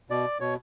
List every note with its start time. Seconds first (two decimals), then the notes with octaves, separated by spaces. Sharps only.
0.10 B2 D5
0.40 B2 C#5